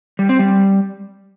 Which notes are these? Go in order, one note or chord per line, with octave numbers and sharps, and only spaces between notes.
G3
C4
G3